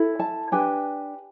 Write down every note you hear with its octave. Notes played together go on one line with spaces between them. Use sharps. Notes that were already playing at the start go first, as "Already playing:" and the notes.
Already playing: E4 A4
A5
D4 G4 B4 G#5